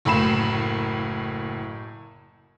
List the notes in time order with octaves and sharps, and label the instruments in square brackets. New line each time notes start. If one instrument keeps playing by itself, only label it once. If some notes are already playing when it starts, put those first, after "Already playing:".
[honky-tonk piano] F#1 A2 A#3 B5 C7 E7